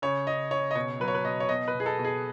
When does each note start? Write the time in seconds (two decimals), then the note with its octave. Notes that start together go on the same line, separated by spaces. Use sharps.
0.02 C#3 C#5
0.27 C#3 D#5
0.51 C#3 C#5
0.71 D#5
0.75 B2 C#5
1.00 F#3 B4
1.08 C#5
1.15 B4
1.25 B2 D#5
1.40 C#5
1.49 B2 D#5
1.68 B4
1.74 B2
1.80 G#4
1.86 A4
1.99 B2
2.05 G#4